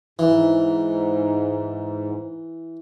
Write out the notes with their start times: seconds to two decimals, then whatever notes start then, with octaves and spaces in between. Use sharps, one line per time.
0.19 G#2 E3